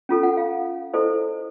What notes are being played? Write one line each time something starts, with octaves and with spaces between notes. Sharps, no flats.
C#4 F4 A4
F#5
F5
E4 A4 C5 D#5